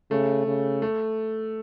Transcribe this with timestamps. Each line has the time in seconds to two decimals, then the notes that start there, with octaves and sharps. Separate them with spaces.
0.10 C#3 A3
0.46 C#3
0.82 A3